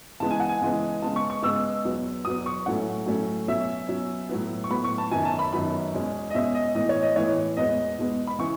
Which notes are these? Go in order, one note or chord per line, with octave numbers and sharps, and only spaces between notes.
C#3 E3 G#3 B3 A5
G#5
F#5
G#5
C#3 E3 G#3 B3
C#3 G#3 B3 A5
C#6
C#6
C#3 G#3 B3 E6
E2 B2 F#3 B3
E2 B2 F#3 B3 D#6
C#6
A2 F#3 A3 C#4 F#5
A2 F#3 A3 C#4
B2 F#3 C#4 E5
B2 F#3 C#4
A2 F#3 B3
C#6
A2 F#3 B3 B5
C#6
A5
F#2 D#3 F#3 B3 G#5
A5
B5
F#2 D#3 F#3 B3 B5
E2 B2 G#3 C#4
D#5
E2 B2 G#3 C#4 E5
D#5
A2 E3 B3 D#5
C#5
D#5
A2 E3 B3 C#5
E2 B2 G#3 B3 D#5
E2 B2 G#3 B3
B5
C#3 E3 C#6